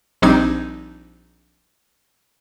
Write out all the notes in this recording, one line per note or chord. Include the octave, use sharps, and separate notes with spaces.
A#1 G3 C4 D4 D#4 G#6